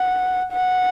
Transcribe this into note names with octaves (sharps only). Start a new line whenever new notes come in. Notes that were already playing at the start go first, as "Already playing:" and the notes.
Already playing: F#5
F#5